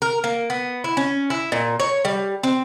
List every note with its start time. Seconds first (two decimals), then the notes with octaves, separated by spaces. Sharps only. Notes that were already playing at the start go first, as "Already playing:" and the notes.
0.02 A#4
0.24 A#3
0.50 B3
0.84 E4
0.97 C#4
1.30 E4
1.52 A#2
1.80 C#5
2.05 G3
2.43 C4